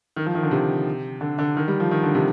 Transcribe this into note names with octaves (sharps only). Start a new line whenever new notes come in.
D#3
F3
D#3
D3
C3
D3
D3
D#3
G3
F3
D#3
D3
C3